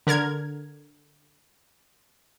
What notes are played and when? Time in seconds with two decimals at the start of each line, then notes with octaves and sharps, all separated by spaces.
0.07 D3 A#4 F6 G#6